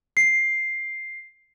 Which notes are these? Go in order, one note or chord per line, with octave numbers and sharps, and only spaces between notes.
C7